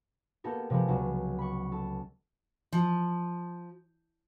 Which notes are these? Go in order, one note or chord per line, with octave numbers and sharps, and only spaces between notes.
A#3 B3 G4 A4 A#4
C3 F3 G#3 A#3 B3
C#2 F#3
B5 C#6
A4
F3